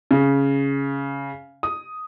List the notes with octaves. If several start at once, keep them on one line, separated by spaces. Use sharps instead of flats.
C#3
D#6